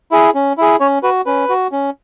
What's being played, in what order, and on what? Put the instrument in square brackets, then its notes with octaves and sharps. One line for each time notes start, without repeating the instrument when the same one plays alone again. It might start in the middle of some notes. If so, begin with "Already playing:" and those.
[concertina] E4 G#4
C#4
E4 G#4
C#4 C#5
F#4 B4
C#4 B4
F#4
C#4